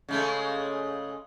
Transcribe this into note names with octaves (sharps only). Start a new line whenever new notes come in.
C#3 G#3 A3